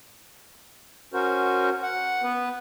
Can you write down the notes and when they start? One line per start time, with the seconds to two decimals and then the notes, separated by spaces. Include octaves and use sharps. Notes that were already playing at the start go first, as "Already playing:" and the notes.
1.13 C#4 F#4 A#4 C5
1.82 F#5
2.23 B3 B4